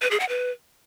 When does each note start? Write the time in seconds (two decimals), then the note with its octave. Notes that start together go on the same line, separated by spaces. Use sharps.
0.02 B4
0.11 G#4
0.20 F#5
0.29 B4